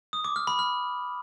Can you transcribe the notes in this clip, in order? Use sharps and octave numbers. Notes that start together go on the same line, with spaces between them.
D#6
D6
F6
B5
F6